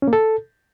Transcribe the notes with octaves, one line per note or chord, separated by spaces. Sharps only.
C#4
A#3
A4